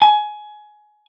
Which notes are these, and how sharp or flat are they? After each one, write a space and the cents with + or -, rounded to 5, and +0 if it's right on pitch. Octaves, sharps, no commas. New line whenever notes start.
G#5 +20